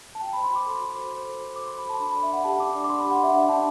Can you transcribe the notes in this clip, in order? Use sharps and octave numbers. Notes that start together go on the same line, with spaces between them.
A5
F#4 G5
B5
C5
C6
F#4 D6
A4
F#4
C5
F#4
A4
F#4
C5 D6
C6
F#4
B5
A4 A5
D4 B5
B5
D5
E5
D4 F#5
G4 A5
D4 D6
D5 D6
D6
D4 C6
B5
G4
F#5
D4 E5
D5 F#5
D4 A5